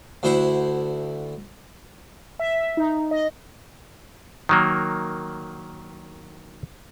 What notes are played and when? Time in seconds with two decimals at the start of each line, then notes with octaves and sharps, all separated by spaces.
0.23 D2 E4 C5 F#5
2.39 E5
2.77 D#4
3.11 D#5
4.49 D#3 F#3 A#3